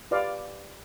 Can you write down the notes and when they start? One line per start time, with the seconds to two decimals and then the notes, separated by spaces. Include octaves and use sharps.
0.11 F4 G4 B4 D5 F5